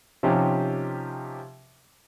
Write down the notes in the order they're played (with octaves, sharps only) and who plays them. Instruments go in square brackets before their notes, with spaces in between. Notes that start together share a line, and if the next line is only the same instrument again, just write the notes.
[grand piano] C3 F3 C#4 D#4 G4